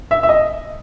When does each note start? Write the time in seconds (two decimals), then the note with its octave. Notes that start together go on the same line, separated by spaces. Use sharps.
0.11 E5
0.23 E5
0.29 D#5